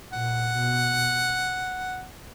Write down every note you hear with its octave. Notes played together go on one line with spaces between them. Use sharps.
A#2 F#5
B2